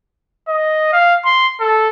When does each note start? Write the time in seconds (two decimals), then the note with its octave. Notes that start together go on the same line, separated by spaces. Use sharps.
0.48 D#5
0.93 F5
1.25 C6
1.60 A4